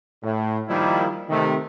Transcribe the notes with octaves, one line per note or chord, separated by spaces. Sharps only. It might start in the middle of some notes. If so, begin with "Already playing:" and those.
A2
D#3 F3 G3 A#3 D#4 E4
C3 D#3 A3